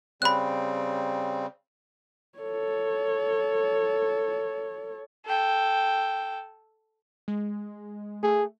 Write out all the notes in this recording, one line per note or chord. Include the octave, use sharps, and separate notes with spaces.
C#3 G3 C4 B5 F#6
A4 C#5
A4 G5
G#3
A3 G#4